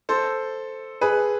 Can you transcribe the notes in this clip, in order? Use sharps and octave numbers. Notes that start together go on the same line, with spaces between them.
A4 C5
G#4 B4